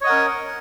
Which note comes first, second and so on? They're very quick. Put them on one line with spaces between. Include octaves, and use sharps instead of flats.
C#5 D#5 F#5 A#4 C#4